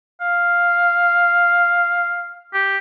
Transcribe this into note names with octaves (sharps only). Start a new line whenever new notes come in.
F5
G4